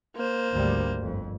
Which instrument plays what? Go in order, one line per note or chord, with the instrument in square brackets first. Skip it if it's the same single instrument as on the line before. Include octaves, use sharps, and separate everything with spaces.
[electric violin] A#3 C5
[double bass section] G#1 D2 G3
G1 F2